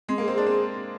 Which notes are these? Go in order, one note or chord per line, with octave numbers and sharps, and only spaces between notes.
G#3 C4
A#3 G#4
C4
D4 G#4
C4